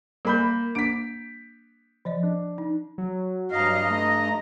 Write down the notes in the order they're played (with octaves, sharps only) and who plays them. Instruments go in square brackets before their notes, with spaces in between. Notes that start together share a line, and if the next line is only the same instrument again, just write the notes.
[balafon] G3 G#5 [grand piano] A#3 B5 G6
[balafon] A#3 D4 D6 [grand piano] B6 D7
[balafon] F3 D5 D#5
[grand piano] D4
[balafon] D#4
[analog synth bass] F#3
[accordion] G2 D#5 [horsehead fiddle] F5 A#5
[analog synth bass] A3 [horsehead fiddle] A#5